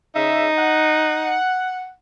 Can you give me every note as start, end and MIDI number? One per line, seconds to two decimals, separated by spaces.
0.16 0.48 49
0.16 1.35 63
0.16 0.48 76
0.57 1.91 78